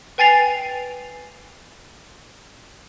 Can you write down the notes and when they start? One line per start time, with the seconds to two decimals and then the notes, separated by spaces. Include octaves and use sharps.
0.18 B4 G5 G#5 A6 C7 F7